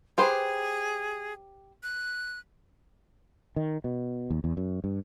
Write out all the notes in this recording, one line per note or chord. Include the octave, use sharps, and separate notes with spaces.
G4 G#4 B4 C5
F#6
D#3
B2
D#2
E2
F#2
G2